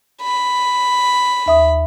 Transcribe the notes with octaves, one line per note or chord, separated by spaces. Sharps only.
B5
D#2 E5 D#6